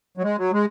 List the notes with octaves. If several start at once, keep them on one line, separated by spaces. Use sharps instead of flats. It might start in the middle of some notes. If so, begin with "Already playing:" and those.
F#3
G#3
F#3
G#3